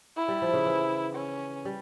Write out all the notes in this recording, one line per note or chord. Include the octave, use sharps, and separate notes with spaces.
E4
G3
F3
C#3
E3
C#4
G3